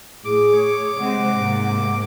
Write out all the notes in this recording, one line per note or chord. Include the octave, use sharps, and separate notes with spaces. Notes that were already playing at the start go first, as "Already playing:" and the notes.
A2 G#4 D6
C#5
C3 G#3 C4 F#5
G#2 C3 A#3